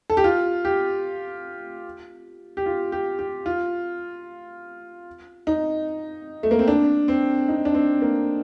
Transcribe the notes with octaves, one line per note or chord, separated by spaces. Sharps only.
A4
G4
F4
G4
G4
F4
G4
G4
F4
D#4
A3
A#3
C4
D4
C4
D#4
D4
C4
A#3